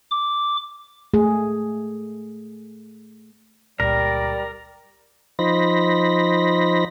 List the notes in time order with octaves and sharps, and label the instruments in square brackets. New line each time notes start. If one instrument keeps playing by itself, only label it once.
[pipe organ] D6
[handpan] A3 G#4
[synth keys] G1 C#2 A#2 [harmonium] G3 [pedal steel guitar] A#4 [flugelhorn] D5
[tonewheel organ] F3 D#4 C5 B5 A#6